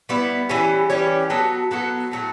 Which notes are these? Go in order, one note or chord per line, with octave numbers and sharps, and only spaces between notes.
G3 B3 E4
E3 G3 C#4 G4
E3 G3 C#4 G4
F#3 B3 F#4 A4
F#3 B3 F#4 A4
A2 F#3 A3